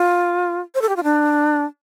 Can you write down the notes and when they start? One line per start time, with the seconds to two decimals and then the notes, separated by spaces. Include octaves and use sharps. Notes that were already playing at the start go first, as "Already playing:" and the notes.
Already playing: F4
0.75 C5
0.82 A4
0.89 G4
0.96 F4
1.03 D4